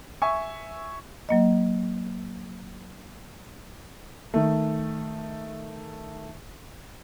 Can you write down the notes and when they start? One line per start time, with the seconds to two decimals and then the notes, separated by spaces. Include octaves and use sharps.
0.22 E5 G#5 C#6
1.29 F#3 A#3 D#5
4.34 D#3 A3